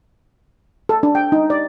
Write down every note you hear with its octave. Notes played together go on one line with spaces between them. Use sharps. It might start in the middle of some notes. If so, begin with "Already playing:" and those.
A4
D4
G5
D#4
D5